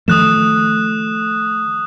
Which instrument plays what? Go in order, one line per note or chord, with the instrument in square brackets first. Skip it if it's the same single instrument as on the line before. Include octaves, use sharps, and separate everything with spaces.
[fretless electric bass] D#3 F3 A3 [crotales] D#6 F#6 E7